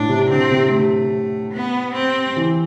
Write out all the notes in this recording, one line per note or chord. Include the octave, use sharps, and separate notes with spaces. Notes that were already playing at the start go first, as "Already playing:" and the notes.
Already playing: A2 D4
C3
D3 C4
C3
C3 A3
B3
C4
E3